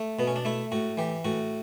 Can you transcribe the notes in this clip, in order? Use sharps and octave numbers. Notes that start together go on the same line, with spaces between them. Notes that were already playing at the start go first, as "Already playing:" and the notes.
Already playing: A3
B2 B3
C#4
D4
A3 E4
A2 F#4
E3 G4
A2 F#4